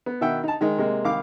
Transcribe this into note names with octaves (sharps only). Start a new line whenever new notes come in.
B3
B2 D#3 E5 F#5 G5
D#4 A5
D#3 G#3 D#4
C3 G#3 A#3
C2 D#3 F5 D6